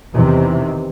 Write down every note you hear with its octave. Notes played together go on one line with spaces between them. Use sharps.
E2 C3 D#3 E3